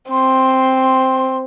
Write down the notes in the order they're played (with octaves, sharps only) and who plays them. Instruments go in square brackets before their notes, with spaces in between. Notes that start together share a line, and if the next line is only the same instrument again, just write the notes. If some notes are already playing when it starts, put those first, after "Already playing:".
[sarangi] C4 [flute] C6